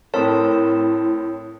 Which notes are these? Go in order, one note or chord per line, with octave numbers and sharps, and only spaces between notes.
A2 C4 E4 A#4 C#5 G5 A5 D#6